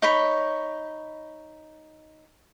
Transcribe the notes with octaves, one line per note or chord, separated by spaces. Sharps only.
D#4 C#5 B5